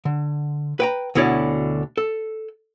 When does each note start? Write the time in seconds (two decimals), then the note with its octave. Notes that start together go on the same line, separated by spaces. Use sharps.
0.05 D3
0.80 B4 G5 A#5
1.15 D2 B2 D3 E4 C#5 D5
1.97 A4